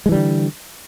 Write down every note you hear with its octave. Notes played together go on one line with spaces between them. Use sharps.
D3 E3 G3 G#3